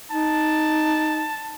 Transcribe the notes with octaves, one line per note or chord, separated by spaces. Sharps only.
D#4 A5